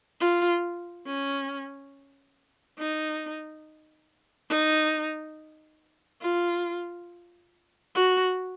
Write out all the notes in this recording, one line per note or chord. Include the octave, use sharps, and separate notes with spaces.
F4
C#4
D#4
D#4
F4
F#4